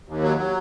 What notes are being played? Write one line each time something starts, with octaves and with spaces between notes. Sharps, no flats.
D#2
F#3
F#3